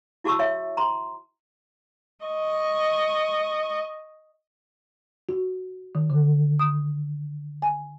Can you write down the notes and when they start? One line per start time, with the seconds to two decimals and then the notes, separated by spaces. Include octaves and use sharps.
0.24 E4 F#4 G#4 A5 C#6 E6
0.39 C#5 E5
0.77 A#5 C6
2.25 D#5 C#6
5.29 F#4
5.95 D#3
6.10 D3
6.59 D#6
7.62 G#5